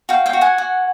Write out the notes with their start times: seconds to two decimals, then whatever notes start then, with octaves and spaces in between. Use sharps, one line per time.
0.09 F#4 F5 G5
0.26 F5 G5
0.33 F#4
0.41 F#5 G#5
0.58 F#4